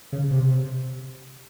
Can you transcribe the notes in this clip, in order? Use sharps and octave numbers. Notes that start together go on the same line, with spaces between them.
C#3
C3